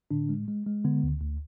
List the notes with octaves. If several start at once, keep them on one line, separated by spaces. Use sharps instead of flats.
A2 D3 D4
G#3
G#3
G#3
D3 B3
D2
D2